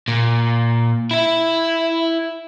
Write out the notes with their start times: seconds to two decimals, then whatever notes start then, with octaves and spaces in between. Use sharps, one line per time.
0.08 A#2
1.11 E4 E5